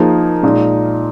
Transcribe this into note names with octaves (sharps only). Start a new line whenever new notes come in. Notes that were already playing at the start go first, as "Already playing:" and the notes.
Already playing: F3 A#3 D#4 G#4
A#2 G#3 D#4